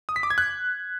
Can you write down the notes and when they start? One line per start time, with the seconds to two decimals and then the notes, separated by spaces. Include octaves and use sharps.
0.09 D#6
0.16 B6
0.23 D6
0.30 G#6
0.38 F#6